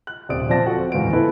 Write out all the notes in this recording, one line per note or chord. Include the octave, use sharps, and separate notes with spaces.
F#6
D#1 C3 D5 D#6 D7
F3 C4 D5 A5 A#6
F4 F#4 A4 C5 F#5
D1 E2 G#2 F4 B4 D7
B3 E4 A4 B4